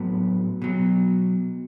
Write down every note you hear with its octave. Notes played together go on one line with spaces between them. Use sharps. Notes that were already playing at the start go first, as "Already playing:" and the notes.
Already playing: A2 F#3 B3
B2 F#3